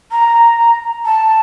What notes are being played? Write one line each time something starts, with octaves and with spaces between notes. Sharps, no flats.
A#5
A5